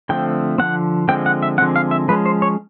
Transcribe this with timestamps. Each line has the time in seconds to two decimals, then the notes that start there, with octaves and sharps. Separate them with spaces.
0.09 D3 F3 A3 C4 G5
0.58 D3 F3 A3 C4 F#5
1.08 D3 F3 G#3 C4 G5
1.26 F#5
1.43 E5
1.58 D3 F3 G#3 C4 F#5
1.76 F5
1.91 E5
2.08 F3 G#3 C#4 B4
2.26 C5
2.42 C#5